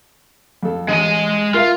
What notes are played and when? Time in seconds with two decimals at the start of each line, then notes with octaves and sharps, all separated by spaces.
0.63 F2 A4
0.88 A1 G#3 G#5
1.54 F4 A#4 E5 F5